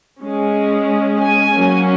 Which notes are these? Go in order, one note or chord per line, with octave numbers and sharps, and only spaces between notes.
G#3 C#4
G#5
F#3 A#3 C#4